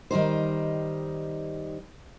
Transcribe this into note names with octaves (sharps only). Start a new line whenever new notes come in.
D#3 G3 D#4 C5